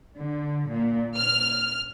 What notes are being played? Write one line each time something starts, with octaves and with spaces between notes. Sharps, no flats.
D3
A#2
F6